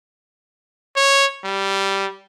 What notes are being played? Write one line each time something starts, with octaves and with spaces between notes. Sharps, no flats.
C#5
G3